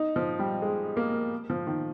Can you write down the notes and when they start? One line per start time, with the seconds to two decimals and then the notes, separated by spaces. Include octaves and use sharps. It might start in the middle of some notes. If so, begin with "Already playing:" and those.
Already playing: D#4
0.16 F3
0.39 G3
0.62 G#3
0.97 A#3
1.50 F3
1.67 D#3